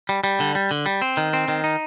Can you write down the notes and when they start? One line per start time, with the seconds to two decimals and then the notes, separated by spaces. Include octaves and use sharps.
0.09 G3
0.24 G3
0.40 D3
0.55 G3
0.71 D3
0.86 G3
1.02 C4
1.17 D#3
1.33 C4
1.48 D#3
1.64 D#4